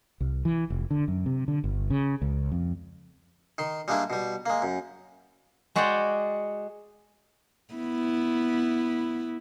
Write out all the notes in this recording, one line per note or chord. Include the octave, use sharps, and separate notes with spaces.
C2
E3
F1
D3
F#2
C3
D3
G1
C#3
C#2
F2
D#3 C6
G3 G#3 A#3 D4 E4
B2 G3
G#3 A#3
F#2
G#3 F#4 G#4 D5 F#5 G5
B3 E4